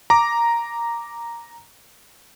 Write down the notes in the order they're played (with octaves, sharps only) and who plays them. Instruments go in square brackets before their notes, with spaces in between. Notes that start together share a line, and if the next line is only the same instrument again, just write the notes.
[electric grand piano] A#5 D6